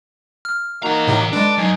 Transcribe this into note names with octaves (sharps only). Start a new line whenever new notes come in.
F6
E3 A#3 D#4 F#4 A#5
A2 C3
G#3 D4 A4 B4 D5
F#2 D#4 G#5